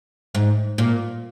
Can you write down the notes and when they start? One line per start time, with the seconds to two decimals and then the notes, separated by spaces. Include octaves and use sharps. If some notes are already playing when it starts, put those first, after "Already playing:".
0.35 G#2
0.78 A#2